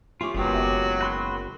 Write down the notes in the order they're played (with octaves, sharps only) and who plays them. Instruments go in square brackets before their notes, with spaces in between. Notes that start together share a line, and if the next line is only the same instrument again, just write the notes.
[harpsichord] A3 C#4 [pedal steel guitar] F4 G4
[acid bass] F#1 [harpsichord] B2 D#3 G#3 [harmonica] F#3
[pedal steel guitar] F#4 B5 C6